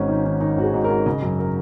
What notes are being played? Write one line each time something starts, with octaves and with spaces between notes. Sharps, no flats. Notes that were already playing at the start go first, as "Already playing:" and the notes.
Already playing: G#1 G#2 C#4
D#3
D#3
D#3 D#4
G#1 F#4
G#4
G#2
A#4
G#2
C#3 D#5
F#2
A#4